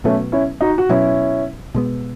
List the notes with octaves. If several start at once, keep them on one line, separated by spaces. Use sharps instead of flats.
B2 F#3 A3 B3 C#4
C#4 E4
D#4 F#4
F#4
B2 F#3 B3 C#4 E4
B2 G#3 B3